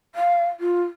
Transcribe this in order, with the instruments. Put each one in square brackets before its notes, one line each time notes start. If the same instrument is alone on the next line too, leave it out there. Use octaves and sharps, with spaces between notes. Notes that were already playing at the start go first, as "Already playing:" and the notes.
[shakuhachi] F5
F4